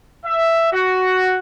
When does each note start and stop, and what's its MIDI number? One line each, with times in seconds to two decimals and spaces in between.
0.24 0.69 76
0.72 1.39 66